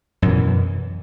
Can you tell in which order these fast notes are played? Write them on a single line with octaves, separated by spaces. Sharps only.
F#2 B2 E3